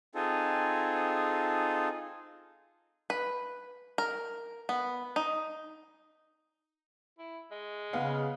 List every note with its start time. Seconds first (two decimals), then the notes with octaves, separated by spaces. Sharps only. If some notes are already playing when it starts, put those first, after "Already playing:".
0.15 C4 D#4 F4 G#4 A4
3.10 B4
3.98 A#4
4.69 B3
5.16 D#4
7.19 E4
7.51 G#3
7.93 C#3 B3 F5 F#5